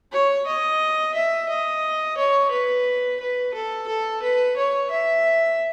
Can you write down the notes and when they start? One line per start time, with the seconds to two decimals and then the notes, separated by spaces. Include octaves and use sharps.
0.12 C#5
0.47 D#5
1.14 E5
1.49 D#5
2.18 C#5
2.51 B4
3.20 B4
3.54 A4
3.88 A4
4.22 B4
4.57 C#5
4.90 E5